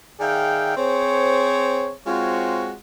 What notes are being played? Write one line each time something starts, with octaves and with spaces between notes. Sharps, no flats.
D#3 G#4 D5 E5 F5 G5
C4 G#4 C5 C#5
G#3 C4 F4 F#4 C5 C#5